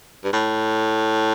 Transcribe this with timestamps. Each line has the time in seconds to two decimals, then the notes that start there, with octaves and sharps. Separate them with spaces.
0.24 G2
0.33 A2